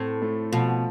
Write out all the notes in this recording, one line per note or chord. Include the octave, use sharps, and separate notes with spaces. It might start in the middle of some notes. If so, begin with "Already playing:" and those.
Already playing: A2 C4
A3
B2 F3